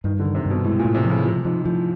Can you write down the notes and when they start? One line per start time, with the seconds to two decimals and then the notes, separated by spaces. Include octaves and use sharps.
0.04 G2 D#3
0.19 D3
0.25 D#3
0.35 C3
0.45 G2 B2
0.64 A2 G#3
0.79 A#2
0.84 A2
0.95 C3
1.05 C#3 F3
1.25 C3 F3
1.45 G#2 F3
1.65 A2 F3